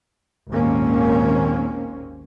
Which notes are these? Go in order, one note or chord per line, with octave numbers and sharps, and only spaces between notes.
G#1 D#2 A#2 A#3 C4 C#4